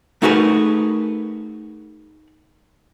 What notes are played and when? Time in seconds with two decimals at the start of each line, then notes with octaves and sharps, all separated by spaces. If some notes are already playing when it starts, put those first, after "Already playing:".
0.22 A3 D#4 F#4 G#4 A#4 B4